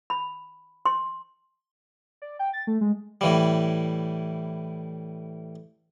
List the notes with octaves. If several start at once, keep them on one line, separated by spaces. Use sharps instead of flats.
B5
C6
D5
G5
A6
A3
G#3
A2 E3 G3